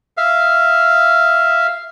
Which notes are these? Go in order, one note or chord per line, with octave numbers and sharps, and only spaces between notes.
E5 F5